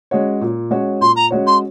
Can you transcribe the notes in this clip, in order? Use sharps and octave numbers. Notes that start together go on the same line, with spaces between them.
G#3 C#4 F#4 C#5
A#2
G#3 C#4 F#4 C#5
A#2 C6
A#5
G#3 C#4 F#4 C#5
C6